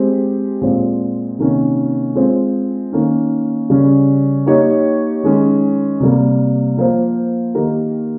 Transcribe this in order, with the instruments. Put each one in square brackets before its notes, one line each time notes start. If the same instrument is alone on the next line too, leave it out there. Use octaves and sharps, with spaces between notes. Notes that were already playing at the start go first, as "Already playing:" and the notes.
Already playing: [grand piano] G#3 C4 G4
A#2 G#3 C4
C3 D#3 A#3 C#4
G#3 C4 F4
D#3 A#3 C#4
C#3 G3 C#4
A#3 D#4 G4 C#5
D#3 G#3 C#4
C3 G3 A#3
F3 A#3 F4 C5
D#3 A#3 D#4 G4 A#4